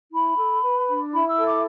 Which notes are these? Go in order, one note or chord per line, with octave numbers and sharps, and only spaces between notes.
E4 B5
A4
B4
D4
E4 B5
E6
A4
D6